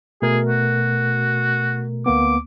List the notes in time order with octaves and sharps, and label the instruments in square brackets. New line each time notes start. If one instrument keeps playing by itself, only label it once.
[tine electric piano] B2 A3 A#4 [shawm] G#4
[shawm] F#4
[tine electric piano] D2 A#3 B3 [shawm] D6